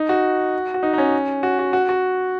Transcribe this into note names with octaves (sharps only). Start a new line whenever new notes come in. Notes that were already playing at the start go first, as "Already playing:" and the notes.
Already playing: D#4
F#4
F#4
D#4
D#4
C#4
F#4
F#4
F#4
F#4